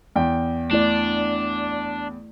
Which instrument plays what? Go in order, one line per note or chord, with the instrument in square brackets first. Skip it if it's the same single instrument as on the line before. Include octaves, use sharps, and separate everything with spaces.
[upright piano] E2 G5
[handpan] A3 E4 D5 [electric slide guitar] D4